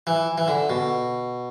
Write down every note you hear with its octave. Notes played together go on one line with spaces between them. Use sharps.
E3
E3
D3
B2